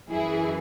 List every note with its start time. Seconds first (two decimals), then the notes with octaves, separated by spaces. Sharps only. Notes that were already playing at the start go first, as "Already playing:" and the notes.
0.10 F#2 E3 E4 G#4